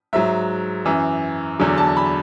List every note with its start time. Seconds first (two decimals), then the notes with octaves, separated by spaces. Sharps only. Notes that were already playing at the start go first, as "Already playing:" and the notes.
0.13 G#2 F#3 E5
0.85 F#2 E3
1.59 E2 D3 F#3
1.78 A5
1.97 B5